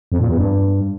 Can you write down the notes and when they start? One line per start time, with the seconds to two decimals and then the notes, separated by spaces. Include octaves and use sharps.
0.12 F2
0.20 A#2
0.29 E2
0.37 G2